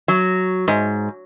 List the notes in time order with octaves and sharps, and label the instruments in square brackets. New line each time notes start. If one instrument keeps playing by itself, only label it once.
[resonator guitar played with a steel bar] F#3
G#2